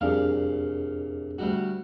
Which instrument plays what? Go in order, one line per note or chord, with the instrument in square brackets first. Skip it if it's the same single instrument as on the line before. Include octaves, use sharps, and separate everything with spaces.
[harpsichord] C2 A#2 F5 [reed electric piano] F2 D4 G#4
[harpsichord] D2 G3 F#4